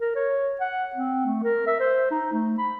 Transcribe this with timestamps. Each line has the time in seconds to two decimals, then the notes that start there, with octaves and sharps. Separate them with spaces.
0.01 A#4
0.16 C#5
0.60 F#5
0.95 C4
1.26 A3
1.43 A#4
1.67 E5
1.80 C5
2.11 D#4
2.33 A3
2.58 B5